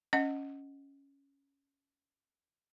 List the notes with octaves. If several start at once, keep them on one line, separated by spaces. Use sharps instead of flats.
C#4 D#5 F#5